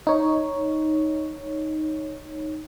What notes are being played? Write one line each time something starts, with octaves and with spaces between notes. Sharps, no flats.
D#4 C#5